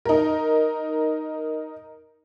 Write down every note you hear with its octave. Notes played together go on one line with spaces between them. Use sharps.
D#4 A#4